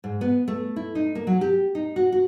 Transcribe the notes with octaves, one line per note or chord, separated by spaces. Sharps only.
G#2
B3
A3
E4
D#4
A#3
F#3
G4
D#4
F#4
F#4